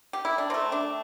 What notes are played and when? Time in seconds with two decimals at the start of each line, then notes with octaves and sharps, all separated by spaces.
0.13 G4
0.25 E4
0.38 D4
0.50 C3 A3 C4
0.72 D4